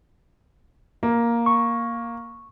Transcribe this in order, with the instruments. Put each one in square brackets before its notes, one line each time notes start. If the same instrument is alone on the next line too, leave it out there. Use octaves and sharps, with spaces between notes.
[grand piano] A#3
[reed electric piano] C#6